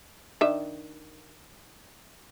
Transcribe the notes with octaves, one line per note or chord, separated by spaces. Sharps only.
D#3 D4 E5